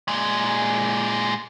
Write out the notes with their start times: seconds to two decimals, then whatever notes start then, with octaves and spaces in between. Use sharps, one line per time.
0.08 A#2 G#3